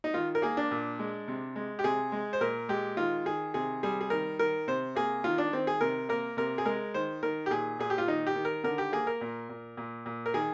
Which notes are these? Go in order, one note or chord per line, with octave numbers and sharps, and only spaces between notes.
D#4
D#3 F4
A#4
A#3 G#4
D4
A#2
G#3
C3
G#3
G4
C3 G#4
G#3
C5
A#2 A#4
G#3 G4
D#3 F4
D#3 G#4
C3 G#4
G3 G#4
G#4
D#3 A#4
D#3 A#4
C3 C5
A#3 G#4
D#3 F4
D4
D#3 C4
G#4
C3 A#4
A#3 A#4
C3 A#4
G#4
G#3 A#4
D#3 C5
D#3 A#4
G4
A#2 G#4
A#2 G#4
G4
F4
D#3 D#4
G4
D#3
A#4
D3 A#4
G4
A#3 G#4
A#4
A#2
A#2
A#2
A#2
A#4
D#3 G#4